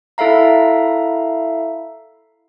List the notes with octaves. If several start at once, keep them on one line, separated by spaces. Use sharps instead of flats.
E4 A4 E5 F5 A#5